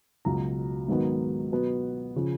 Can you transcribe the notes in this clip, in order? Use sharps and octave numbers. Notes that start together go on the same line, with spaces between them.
C#2 B2 F#3 A#5
G#2 D#3 F#3 B3
B2 F#3 B3
C#3 F3